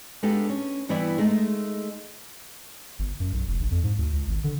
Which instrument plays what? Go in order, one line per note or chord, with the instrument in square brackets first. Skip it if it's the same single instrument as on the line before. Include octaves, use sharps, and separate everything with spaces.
[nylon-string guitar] G#3 B3 D4 G4 A4 F5
C#4
G2 E3 B3 E4 D5 E5
G#3 A3 D#4 E5
[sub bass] G1
F#2
B1
F1
A#1
F2
G#2
D2
C#2
G#1
D3